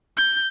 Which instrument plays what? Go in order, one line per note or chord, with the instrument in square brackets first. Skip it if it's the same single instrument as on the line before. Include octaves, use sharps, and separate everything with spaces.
[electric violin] G6